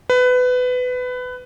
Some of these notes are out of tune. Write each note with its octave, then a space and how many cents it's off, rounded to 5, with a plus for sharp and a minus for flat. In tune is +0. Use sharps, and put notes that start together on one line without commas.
B4 +20